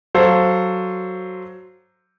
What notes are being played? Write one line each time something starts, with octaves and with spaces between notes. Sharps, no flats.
F#3 A4 C5 F5